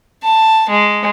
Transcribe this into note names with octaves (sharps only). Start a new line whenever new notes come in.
A5
G#3